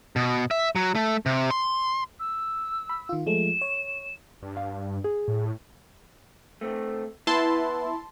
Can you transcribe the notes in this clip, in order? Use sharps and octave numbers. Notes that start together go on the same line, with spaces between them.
B2
E5
F#3
A3
C3
C6
E6
B5
D#3 F4
F3 G#3 A3 E7
C#5
G2
F5
G#4
A2
A3 C4
B3 E4 A5 C6